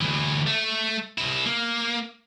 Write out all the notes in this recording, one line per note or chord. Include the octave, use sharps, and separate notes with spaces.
D2 E3
A3
C2 E4
A#3